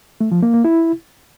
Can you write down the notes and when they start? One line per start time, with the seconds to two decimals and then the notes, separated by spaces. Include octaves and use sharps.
0.21 A3
0.32 F3
0.42 A#3
0.53 A#3
0.64 E4